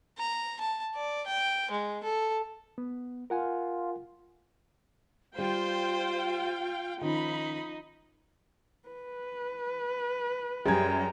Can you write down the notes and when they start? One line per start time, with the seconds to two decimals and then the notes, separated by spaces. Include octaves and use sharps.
0.18 A#5
0.60 A5
0.95 D5
1.27 G5
1.71 G#3
2.04 A4
2.78 B3
3.30 F4 A#4 F#5 G#5
5.38 G3 F4 C5 F5 G5
7.01 D#3 F3 C#4 D#4 B5
8.89 B4
10.66 F#2 G3 G#4 G5 A#5 G#6